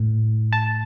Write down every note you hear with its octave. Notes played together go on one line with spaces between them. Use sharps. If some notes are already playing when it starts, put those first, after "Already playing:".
Already playing: A2
A5